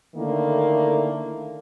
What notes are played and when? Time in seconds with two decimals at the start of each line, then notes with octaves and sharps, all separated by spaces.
0.16 D3 D#3 A3 A#3 E4